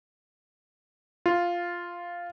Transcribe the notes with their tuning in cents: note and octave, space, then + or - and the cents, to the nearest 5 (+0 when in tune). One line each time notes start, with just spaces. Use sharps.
F4 +0